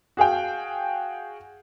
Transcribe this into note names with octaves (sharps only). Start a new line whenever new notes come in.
F#4 G#4 F5 G5